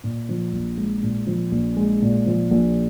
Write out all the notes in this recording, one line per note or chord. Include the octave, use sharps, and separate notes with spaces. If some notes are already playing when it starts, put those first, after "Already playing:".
A#2
F3
A#1
G#3
A#2
F3
A#1
G#3
A#2
F3
A#1